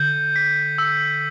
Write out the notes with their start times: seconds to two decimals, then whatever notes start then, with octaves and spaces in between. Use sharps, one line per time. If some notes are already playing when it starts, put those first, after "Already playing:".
Already playing: D3 G6
0.36 B6
0.78 E6